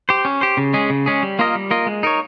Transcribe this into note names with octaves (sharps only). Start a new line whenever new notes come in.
G4 C5
C#4
G4 C5
C#3
G#3 C#4 G#4
C#3
G#3 C#4 G#4
G3
A#3 F4 A#4 D#5
G3
A#3 F4 A#4 D#5
G#3
D#4 A#4 C#5